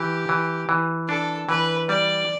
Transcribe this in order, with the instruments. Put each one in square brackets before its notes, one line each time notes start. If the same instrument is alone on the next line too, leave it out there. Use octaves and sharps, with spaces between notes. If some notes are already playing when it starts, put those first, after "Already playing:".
Already playing: [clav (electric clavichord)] E3 [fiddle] G4
[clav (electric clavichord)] E3
E3
[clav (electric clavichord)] D4 [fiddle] A4
[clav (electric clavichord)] E3 [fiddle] B4
[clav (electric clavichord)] G3 [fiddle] D5